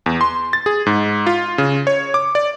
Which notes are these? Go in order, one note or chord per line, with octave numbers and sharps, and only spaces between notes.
E2
C6
A6
G#4
G#2
F4
C#3
C#5
D6
D5